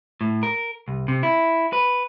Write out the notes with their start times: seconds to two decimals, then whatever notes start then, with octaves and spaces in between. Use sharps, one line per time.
0.21 A2
0.43 A#4
0.88 C2
1.08 C3
1.23 E4
1.73 B4